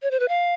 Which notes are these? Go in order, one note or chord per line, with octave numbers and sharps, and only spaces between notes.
C#5
C5
B4
F5